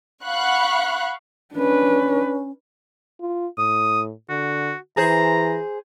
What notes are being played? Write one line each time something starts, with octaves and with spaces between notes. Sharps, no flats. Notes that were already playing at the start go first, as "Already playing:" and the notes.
F5 F#5 B5 C#6 F#6
C#4 D4 B4
F4
A2 D#6
D3 F#4
E3 G#4 C5 A#5